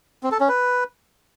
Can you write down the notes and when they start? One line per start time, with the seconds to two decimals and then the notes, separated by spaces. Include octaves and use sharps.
0.23 C4
0.32 A4
0.40 C#4
0.49 B4